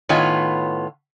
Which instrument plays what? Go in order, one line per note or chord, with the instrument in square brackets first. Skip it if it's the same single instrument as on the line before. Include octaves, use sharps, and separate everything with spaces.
[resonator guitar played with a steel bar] A2 D#3 B3 F4 C#5 G#5